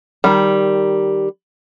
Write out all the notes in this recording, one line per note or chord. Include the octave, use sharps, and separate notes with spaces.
D#3 G3